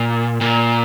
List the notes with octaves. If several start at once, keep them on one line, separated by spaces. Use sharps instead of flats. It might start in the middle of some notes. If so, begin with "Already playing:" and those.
Already playing: A#2
A#2